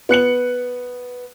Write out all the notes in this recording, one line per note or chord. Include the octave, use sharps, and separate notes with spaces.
B3 F#6 C#7 F#7